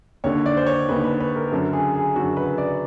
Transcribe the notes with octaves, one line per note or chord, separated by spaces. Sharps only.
D#2 D3 C#5
D5
C5
C#5
D#2 D3 B4
B4
B4
A#4
F#2 D3 A4
G#4
G#4
F#2 D3 F#4
B4
D5